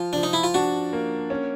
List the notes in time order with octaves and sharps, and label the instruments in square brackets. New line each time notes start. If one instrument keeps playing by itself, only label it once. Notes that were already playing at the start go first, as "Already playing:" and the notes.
Already playing: [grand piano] F3 [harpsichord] F4
[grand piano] F3 [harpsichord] D4
[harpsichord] D#4
E4
F4
[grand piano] D4 [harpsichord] F#4
[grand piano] A#3
C#4